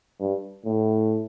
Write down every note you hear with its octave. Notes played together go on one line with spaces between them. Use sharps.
G2
A2